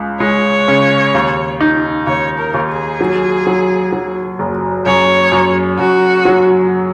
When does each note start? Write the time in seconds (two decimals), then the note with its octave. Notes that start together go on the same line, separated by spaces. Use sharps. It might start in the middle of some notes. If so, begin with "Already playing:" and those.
Already playing: C#2 G#3
0.20 G#3 C#5
0.68 C#3
1.15 D#2
1.61 D#4
2.07 D#2 C#5
2.38 A#4
2.54 D#2
2.69 G#4
3.01 F#3
3.47 F#3
3.92 F#3
4.39 F#1
4.86 F#2 C#5
5.32 F#2
5.79 F#2 F#4
6.25 F#3